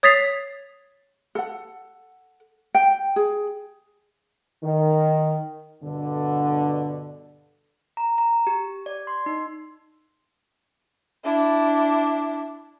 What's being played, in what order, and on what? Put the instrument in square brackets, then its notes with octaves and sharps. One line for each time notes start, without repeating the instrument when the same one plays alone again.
[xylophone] C#5 D#6 A6 B6 C7 F7
[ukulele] A4 F#5
G5
G#4
[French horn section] D#3
G2 B2 D3
[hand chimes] A#5
A#5
G4
D5
C6
D#4
[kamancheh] D4 E4